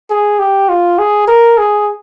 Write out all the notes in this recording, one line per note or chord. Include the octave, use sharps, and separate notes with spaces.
G#4
G4
F4
G#4
A#4
G#4